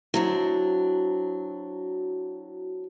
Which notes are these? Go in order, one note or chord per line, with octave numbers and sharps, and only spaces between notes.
F#3 C4 D4 E4 F#4